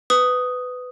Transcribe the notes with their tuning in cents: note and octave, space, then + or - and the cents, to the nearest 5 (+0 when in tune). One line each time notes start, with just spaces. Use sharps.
B4 +20 D#6 +0